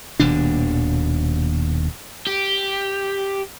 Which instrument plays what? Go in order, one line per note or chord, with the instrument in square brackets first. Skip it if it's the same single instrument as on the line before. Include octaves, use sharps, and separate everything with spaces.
[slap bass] D#1 D#2 B2 D4
[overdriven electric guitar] G4